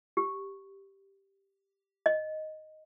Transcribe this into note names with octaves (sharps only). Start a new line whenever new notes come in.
G4
D#5